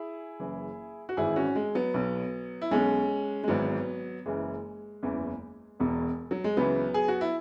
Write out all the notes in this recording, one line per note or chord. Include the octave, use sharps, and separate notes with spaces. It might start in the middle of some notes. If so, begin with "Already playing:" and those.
Already playing: E4 G#4
F#1 F#2 E3
F#4
G#1 G#2 E3 E4 G#4
C#4 F#4
G#3
F#3 B3
B1 B2
E4
B1 B2 G#3 C#4
G#3
G#1 G#2 E3 F#3 B3
F#1 F#2 C#3 E3 G#3
F#1 E2 C#3 E3
E1 E2 B2
F#3
G#3
C#2 C#3 E3 F#3 B3
G#4
F#4
E4